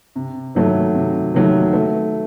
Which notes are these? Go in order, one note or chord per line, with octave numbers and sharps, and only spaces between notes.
C3
D#3 F#3 A3
C3
D#3 F#3 A3
A3